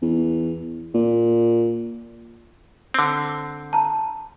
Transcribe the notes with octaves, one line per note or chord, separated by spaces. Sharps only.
E2
A#2
D3 C4
A5 A#5